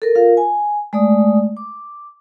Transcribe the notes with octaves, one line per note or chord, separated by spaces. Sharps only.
A4 A#4
F4 A#4 F5
G#5
G#3 A3 D5 D#6
D6